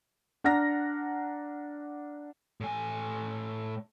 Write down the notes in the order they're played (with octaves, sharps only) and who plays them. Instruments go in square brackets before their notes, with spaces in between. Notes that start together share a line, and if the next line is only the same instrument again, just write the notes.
[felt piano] D4 F#5 A#5 F6 A#6
[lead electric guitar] A2 G#5